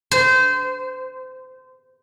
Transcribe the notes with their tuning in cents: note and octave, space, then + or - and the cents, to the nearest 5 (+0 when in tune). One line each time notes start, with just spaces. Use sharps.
C5 -25